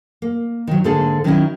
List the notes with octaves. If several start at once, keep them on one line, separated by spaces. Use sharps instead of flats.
A#3
D#3 F#3
G#2 D3 A#3 G#4 A4
D#3 F#3 B3 C#4 D#4 E4